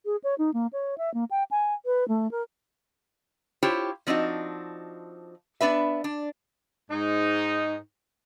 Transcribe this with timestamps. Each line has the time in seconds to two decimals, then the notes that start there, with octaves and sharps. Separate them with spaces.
0.05 G#4
0.24 C#5
0.38 D#4
0.54 A#3
0.73 C#5
0.98 E5
1.14 A#3
1.31 G5
1.51 G#5
1.85 B4
2.08 A3
2.31 A#4
3.63 E4 F4 G4 C5 C#5
4.07 F3 C4 D4 D#4 F#4
5.61 B3 D4 B4 E5
6.04 D4
6.91 G#2 D#4